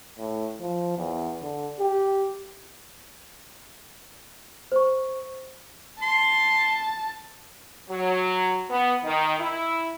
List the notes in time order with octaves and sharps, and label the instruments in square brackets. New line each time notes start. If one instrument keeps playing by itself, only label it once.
[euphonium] A2
F3
E2
D3
G4
[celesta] C5 C#6
[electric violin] A5 [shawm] C6
[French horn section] F#3
B3
D#3
E4